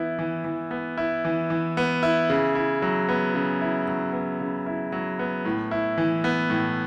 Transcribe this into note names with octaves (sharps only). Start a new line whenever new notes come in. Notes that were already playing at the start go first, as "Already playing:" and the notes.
Already playing: E3 B3 E4
E3
E3
B3
E4
E3
E3
B3
E4
C#3
E4
F#3
B3
C#3
E4
F#3
B3
C#3
E4
F#3
B3
A2
E4
E3
B3
A2